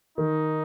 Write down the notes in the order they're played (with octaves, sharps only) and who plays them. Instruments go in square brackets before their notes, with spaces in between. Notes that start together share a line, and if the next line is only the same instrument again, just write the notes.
[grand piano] D#3 [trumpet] D#4